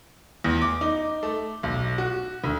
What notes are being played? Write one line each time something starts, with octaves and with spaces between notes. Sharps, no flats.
E2
D6
D#4
A3
B1
F#4
D2